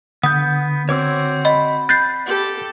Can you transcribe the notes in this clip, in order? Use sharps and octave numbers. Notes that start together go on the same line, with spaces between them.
D3 B3 F#5 D#6 G6
C4 F#4 C#5 D6 E6
D#5 B5
F#6 G6 A6 C7
G4 A4